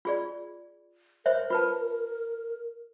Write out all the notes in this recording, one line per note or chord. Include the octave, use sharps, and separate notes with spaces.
F4 G#4 D5
A#4 C5 C#5 E5
F4 B4 A5